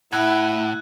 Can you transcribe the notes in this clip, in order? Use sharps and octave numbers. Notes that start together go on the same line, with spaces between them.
A2 E4 F#5 E6 F#6 G#6